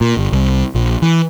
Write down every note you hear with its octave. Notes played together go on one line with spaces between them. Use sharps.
A#2
G1
C2
A#1
E3